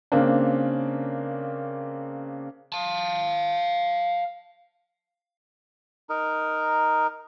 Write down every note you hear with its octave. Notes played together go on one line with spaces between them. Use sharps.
C#3 A#3 C4 D4
F5 A5
D#4 A#4